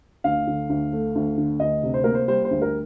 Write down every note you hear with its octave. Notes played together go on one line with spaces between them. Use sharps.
D2 F5
D3
D2
A3
D2
D3
D2 D#5
C3
C5
A#3 A#4
C5
G3 C5
C5
D2
A#4